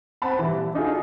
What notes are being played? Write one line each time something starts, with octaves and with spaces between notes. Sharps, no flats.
C4 F#5 A5 B5
E3 G3
A#1
D4 D#4 F4 F#4 G#4 A4